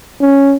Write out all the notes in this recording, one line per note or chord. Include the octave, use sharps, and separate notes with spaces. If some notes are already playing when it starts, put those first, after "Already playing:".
C#4